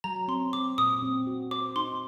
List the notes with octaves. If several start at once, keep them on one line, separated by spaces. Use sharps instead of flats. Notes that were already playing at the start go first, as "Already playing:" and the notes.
F#3 A#5
C4 C6
C4 D6
A#2 D#6
C4
F#4
C5 D6
D#4 C6